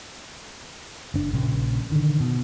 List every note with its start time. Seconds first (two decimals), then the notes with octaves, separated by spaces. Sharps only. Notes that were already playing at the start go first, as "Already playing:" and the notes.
1.14 F#1 D4
1.33 A#1 C#3
1.92 D3 D#3
2.20 B2